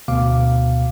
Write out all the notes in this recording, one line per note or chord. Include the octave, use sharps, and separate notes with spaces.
D2 B2 F5 D6